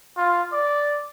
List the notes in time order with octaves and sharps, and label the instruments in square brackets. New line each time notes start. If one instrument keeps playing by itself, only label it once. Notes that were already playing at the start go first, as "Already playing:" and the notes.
[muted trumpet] F4
D5